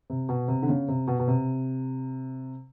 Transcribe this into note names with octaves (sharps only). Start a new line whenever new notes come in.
C3
B2
C3
D3
C#3
C3
B2
B2
C3